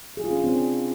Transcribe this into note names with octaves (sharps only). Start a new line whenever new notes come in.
G#4
F4
C#4
D4
C4